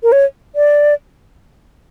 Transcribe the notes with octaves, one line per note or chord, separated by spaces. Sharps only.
A#4
C#5
D5